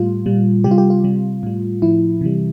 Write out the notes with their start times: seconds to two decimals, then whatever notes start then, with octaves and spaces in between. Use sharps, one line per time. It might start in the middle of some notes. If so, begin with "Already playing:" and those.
Already playing: A2 G3 F4
0.26 A#2 G3
0.64 C3 G3 G4
0.71 F4
0.78 G4
0.90 F4
1.04 C3 G3
1.43 A2 G3
1.82 A2 F3 E4
2.21 C3 E3 G3